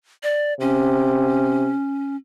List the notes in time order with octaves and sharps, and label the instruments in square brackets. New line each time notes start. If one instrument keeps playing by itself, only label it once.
[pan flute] D5
[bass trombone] C3 [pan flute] C#4